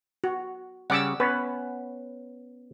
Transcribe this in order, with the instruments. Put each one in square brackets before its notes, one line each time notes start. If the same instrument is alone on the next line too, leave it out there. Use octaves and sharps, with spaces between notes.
[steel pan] F#4
[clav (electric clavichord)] C#3 G3 C#4 [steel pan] F#5 D6 E6
[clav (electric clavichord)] B3 C#4 C#5 [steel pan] B4